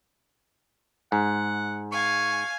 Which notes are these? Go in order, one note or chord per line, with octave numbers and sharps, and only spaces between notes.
G#2 F#5
F5 G#5 C#6